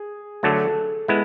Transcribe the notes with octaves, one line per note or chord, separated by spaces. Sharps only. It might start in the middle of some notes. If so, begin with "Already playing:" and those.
Already playing: G#4
D3 F#3 A3 A4
G#3 B3 E4